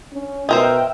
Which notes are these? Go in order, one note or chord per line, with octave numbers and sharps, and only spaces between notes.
C#4
B2 D#4 A#4 C5 E5 G5